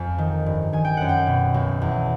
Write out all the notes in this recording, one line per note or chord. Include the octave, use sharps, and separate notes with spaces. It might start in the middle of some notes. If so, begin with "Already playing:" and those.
Already playing: F2 G#5
D#3
G2
D#3 G#5
G5
F#2 F#5
G5
B2
B1
E2